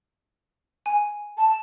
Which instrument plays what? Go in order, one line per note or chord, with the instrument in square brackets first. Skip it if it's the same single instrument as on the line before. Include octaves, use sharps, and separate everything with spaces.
[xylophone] G#5
[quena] A5